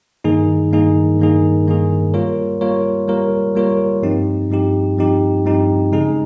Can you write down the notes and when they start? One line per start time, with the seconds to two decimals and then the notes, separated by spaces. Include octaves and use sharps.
0.24 G2 D#3 A#3 D#4 G#4
0.72 G2 D#3 A#3 D#4 G#4
1.19 G2 D#3 A#3 D#4 G#4
1.67 G2 D#3 A#3 D#4 G#4
2.14 G3 A#3 F4 A#4 C#5
2.61 G3 A#3 F4 A#4 C#5
3.08 G3 A#3 F4 A#4 C#5
3.55 G3 A#3 F4 A#4 C#5
4.03 G2 F3 C4 D#4 G4
4.50 G2 F3 C4 D#4 G4
4.97 G2 F3 C4 D#4 G4
5.45 G2 F3 C4 D#4 G4
5.92 C#3 G#3 D#4 G#4